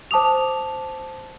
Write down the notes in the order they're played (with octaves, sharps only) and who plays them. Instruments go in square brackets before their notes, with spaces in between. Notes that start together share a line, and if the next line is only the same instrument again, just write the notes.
[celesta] C5 A5 D6 D#6 F7